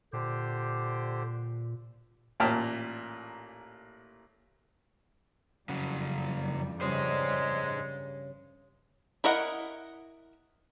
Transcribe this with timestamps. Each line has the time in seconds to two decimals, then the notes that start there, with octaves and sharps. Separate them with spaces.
0.13 A#2 D3 G4 C5
2.40 A1 A#2 G5 A5 A#5 F6
5.69 F2 C#3 F#3 G3 F#5
6.81 G2 C#3 G#3 D4 G#4 C5
9.24 E4 A#4 D#5 F#5